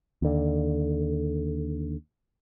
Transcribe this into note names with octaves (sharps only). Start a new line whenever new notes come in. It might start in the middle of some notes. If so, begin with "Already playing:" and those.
D#2 D3